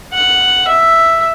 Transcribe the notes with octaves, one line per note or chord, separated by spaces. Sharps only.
F#5
E5